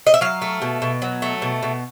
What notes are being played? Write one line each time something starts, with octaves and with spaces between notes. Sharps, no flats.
D#5
E5
F#3 F5
A3
B2
B2
F#3
A3
B2
B2